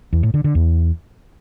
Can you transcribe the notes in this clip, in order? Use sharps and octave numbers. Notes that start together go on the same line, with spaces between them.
E2
A2
D3
D3
E2